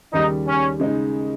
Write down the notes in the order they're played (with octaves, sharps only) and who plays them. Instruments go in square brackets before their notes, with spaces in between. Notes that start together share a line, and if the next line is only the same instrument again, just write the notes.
[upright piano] D#2 C#3 G3 [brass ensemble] D#4
[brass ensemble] C#4
[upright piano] C#3 G#3 D#4